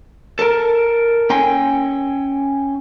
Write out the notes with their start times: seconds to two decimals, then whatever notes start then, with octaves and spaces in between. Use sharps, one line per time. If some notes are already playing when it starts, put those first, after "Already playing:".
0.39 A4 A#4
1.30 C#4 G5 G#5